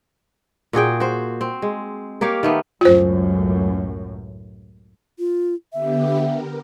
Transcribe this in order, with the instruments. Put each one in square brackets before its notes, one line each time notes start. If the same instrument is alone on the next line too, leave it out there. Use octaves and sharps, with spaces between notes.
[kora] A#2 F#4 G#4 G5
F#4 C5
C4
G#3
A#3 G4 C#5 F5
D#3 A3 B3
[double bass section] C#2 F#2 A2 [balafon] F4 C5
[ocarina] F4
[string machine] D3 B3 G4 [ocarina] E5
[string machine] A#4